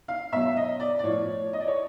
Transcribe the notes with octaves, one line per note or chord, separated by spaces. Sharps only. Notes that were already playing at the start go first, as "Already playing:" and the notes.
F5
B2 F#3 E5
D#5
D5
D5
A2 F3 C#5
D#5
D5
C#5